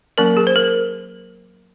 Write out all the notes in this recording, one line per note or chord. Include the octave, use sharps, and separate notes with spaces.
F#3 A#3 C#4 A#4
G#4
C5
A#4